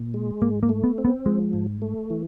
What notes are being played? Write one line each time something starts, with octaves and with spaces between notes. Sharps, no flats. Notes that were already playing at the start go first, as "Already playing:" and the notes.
Already playing: A#2
G#3
G#2 A#3
A#3
A3
B3
C4
B3
F3 G#3
G#2
A3
E3